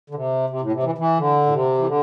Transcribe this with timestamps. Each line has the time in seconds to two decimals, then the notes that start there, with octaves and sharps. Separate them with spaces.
0.10 D3
0.15 C3
0.50 C3
0.61 A2
0.72 C3
0.83 E3
0.98 E3
1.18 D3
1.46 A2
1.51 C3
1.78 E3
1.86 D3